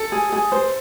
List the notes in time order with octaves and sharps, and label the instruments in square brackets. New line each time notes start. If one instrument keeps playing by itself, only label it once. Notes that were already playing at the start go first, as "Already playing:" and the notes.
Already playing: [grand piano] A4
[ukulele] G#4
G#4
C5